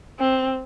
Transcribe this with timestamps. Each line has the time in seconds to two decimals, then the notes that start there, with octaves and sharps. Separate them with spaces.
0.20 C4